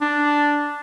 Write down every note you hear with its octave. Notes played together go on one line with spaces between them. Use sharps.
D4